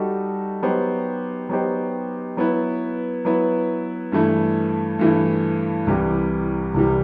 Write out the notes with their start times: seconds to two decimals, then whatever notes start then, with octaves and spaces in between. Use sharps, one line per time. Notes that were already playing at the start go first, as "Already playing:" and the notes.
Already playing: G3 D#4 F#4 A4
0.63 F#3 B3 D#4 G4 C5
1.49 F#3 B3 D#4 G4 C5
2.37 F#3 B3 E4 B4
3.25 F#3 B3 E4 B4
4.12 G2 E3 A3 E4
4.99 G2 E3 A3 E4
5.87 C2 C3 E3 G3
6.74 C2 C3 E3 G3